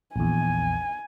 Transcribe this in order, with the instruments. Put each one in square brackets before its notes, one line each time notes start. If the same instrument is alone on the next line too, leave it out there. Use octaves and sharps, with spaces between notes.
[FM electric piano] A#1 E2 [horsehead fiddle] G#5